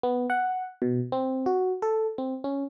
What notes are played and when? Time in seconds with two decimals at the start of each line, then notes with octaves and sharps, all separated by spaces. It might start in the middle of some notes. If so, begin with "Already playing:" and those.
0.03 B3
0.30 F#5
0.82 B2
1.12 C4
1.46 F#4
1.82 A4
2.18 C4
2.44 C#4